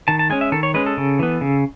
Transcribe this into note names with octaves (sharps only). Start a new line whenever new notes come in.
D#3 A5
A5
G#3 C#4 G#5
E5
D#3 A4
C#5
G#3 C#4 B4
A4
C#3
E3 B3
C#3